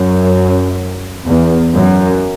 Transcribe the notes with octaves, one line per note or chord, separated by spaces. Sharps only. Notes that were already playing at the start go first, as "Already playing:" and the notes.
Already playing: F#2
E2
F#2